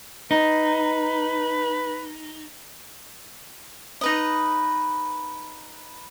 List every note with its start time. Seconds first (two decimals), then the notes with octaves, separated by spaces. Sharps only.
0.31 D#4 B4
4.01 D#4 B4 D#5